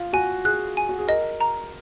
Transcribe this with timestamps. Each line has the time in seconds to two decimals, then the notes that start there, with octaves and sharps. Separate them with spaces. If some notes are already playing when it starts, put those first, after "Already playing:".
Already playing: F4
0.13 F#4 G#5
0.45 G#4 F#6
0.77 G#5
0.89 F#4
0.99 G#4
1.08 A#4 D#5
1.41 A#5